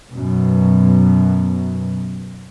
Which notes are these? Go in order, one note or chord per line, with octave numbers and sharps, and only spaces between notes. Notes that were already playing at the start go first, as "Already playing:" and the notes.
F#2 B2